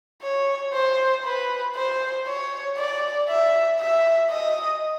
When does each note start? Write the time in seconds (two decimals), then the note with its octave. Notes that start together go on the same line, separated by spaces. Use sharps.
0.22 C#5
0.73 C5
1.24 B4
1.75 C5
2.27 C#5
2.77 D5
3.29 E5
3.80 E5
4.30 D#5